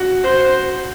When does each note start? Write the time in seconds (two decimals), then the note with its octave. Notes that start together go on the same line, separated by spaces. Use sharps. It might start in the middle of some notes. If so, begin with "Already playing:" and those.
Already playing: F#4
0.24 F#4 C5